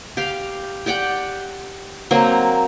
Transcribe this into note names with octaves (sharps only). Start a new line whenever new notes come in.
G4 F5
G4 D5 F#5 G5
F#3 A#3 C4